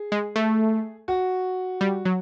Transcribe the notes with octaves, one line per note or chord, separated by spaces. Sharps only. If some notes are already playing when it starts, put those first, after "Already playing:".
Already playing: G#4
G#3
A3
F#4
G3
F#3